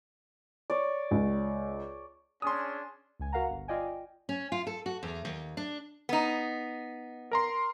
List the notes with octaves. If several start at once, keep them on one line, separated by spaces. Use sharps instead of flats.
C#5 D5
C#2
C#4 D4 G#4 C6 D#6
C#2 G#5
F#4 A#4 F5 F#5 A#5
G1
F4 D5 D#5 G5 G#5
G5
C#4
F4
A4
F#4
E2
D#2
D4
B3 D#4
A#4 A#5 C6